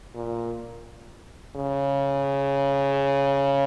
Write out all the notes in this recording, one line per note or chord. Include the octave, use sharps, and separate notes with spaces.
A#2
C#3